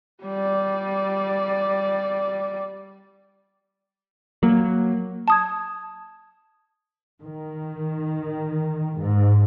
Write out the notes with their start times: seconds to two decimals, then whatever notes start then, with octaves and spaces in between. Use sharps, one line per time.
0.24 G3 D5
4.43 F#3 A#3
5.28 A5 D#6 G#6
7.24 D#3
8.97 G#2